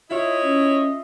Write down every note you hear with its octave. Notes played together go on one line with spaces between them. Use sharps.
E4 F4 C#5 D#5 E5
C#4